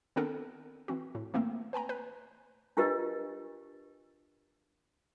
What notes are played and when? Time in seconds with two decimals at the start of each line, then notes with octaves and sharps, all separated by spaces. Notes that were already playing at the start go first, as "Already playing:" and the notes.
0.16 D#3 B3 C4 D4 A4 A#4
0.88 E3 C4 F#4
1.15 A2
1.34 E3 A3 A#3 C4
1.73 B4 G5 G#5 A#5
1.89 B4
2.77 D4 F4 G4 A#4 B4 D#5